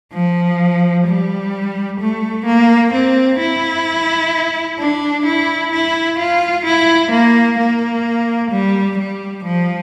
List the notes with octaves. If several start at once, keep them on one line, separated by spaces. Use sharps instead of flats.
F3
G3
A3
A#3
C4
E4
D4
E4
E4
F4
E4
A#3
A#3
G3
G3
F3